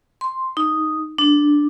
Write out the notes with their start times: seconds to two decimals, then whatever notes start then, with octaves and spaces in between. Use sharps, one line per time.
0.21 C6
0.57 D#4
1.18 D4